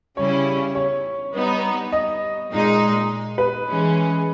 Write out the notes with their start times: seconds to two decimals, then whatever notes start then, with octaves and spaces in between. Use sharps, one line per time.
0.17 C#3 G3 C#4 E4 C#5
0.75 C#5
1.34 G3 B3 D#4
1.93 D#5
2.50 A#2 G#3 D#4
3.38 B4
3.67 E3 G#3 C#4